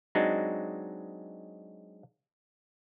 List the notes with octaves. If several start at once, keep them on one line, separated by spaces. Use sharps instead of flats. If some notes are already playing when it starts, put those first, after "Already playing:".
F#3 G#3 C4 D4 D#4 F#4